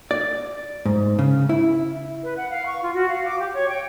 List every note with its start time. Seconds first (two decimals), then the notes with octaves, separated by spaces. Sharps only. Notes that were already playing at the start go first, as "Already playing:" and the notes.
0.11 D5
0.85 G#2
1.19 C#3
1.49 E4
2.23 B4
2.36 F#5
2.51 F5
2.65 C#6
2.82 F4
2.93 F#4
3.08 F5
3.26 D6
3.39 G4
3.54 C#5
3.69 G5